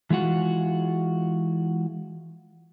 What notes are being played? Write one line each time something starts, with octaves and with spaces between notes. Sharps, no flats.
E3 G#3 F4 F#4